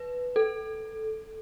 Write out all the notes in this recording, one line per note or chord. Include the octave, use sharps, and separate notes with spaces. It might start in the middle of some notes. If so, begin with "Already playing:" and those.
Already playing: B4
A4